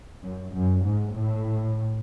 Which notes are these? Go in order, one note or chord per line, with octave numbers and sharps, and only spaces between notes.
F#2
F#2
G#2
A2